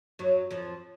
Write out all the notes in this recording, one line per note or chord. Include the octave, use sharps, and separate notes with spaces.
F#2 F#3
F2 F3